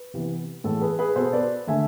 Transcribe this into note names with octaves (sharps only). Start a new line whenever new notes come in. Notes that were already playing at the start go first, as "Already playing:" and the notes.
Already playing: B4
C3 E3 B3
A2 E3 G#3 B3 A4
G#4 B4
G#4 B4
B2 B3 A4 C5
B4 D5
D3 A3 E5 G#5